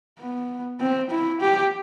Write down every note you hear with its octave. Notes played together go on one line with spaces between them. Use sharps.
B3
C4
E4
G4